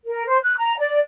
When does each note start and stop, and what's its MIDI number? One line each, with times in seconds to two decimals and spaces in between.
0.06 0.25 70
0.26 0.37 72
0.43 0.53 90
0.58 0.75 82
0.78 0.98 74